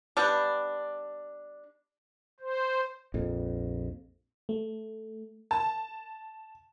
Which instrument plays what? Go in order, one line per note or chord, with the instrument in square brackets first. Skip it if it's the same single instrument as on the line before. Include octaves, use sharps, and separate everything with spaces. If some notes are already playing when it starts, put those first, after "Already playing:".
[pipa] G3 B3 D4
[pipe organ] C5
[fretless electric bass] A#1 F2
[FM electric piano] A3
[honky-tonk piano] A5